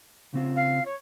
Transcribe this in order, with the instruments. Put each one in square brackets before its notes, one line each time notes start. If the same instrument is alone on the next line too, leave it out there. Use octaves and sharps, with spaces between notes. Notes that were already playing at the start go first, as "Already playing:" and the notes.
[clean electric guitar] C#3 C4 F4
[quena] F5
C#5